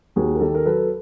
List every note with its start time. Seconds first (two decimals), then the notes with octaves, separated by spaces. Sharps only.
0.16 D#2 F#4 G#4
0.35 A#4
0.41 D#3 G4 A4
0.54 A#4
0.65 F#3 A4 B4